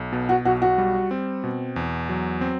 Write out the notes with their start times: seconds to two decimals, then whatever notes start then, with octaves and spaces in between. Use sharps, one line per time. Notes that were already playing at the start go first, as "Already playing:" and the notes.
Already playing: B1
0.12 B2
0.29 F#4
0.45 B1 F#4
0.62 F#4
0.78 G3
1.11 C4
1.44 B2
1.76 E2
2.09 F#3
2.41 C4